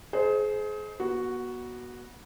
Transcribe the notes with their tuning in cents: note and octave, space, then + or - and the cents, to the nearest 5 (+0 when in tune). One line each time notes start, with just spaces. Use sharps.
G#4 +30 C5 -10 D#5 +0
B3 -35 F#4 +0